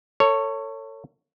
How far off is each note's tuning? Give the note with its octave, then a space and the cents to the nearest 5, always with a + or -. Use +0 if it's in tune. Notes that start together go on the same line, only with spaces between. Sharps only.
A4 +35 C#5 +0